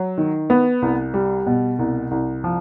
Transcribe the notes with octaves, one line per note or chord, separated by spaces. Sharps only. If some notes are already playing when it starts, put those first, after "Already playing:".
Already playing: F#3
D#3
B3
C2
G3
B2
C2
C2
F3